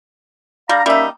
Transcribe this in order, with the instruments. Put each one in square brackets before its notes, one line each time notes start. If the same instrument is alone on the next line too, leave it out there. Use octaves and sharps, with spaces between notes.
[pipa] G3 [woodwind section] D4 F5 A#5
[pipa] G3 D#4 [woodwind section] A#3 C#4 E5